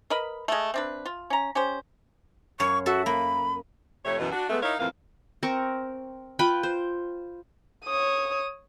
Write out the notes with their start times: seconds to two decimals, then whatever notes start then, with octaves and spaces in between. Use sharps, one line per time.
0.10 A#4 B4 D#5 B5
0.48 G#3 A3
0.74 C4 D4 B4
1.06 F4
1.30 C#4 A#5
1.55 C#4 G4 C5
2.60 F#2 C#5 F5 C#6
2.86 F#4 A4 E5
3.06 A#3 B5
4.05 F2 C3 A3 C#5
4.19 F#2 B2 E3
4.32 D4 F#4
4.50 G#3 A3 B3
4.62 D#4 E4 A#4 C#5 D#5 F5
4.78 F2 A2 E3 A#3 C4 F5
5.43 C4 A#4 C#6
6.39 F4 B4 G5 B5
6.63 C5
7.85 C#5 D#6